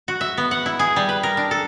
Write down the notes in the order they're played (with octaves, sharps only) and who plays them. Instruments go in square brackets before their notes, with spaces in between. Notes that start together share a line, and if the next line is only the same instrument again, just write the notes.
[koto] F#4
E5
B3
F#5
E4
G#4
G3
B4
A#4
D4
A4